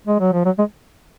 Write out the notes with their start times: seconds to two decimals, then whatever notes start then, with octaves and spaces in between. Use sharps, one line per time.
0.07 G#3
0.20 F#3
0.32 F3
0.45 F#3
0.59 G#3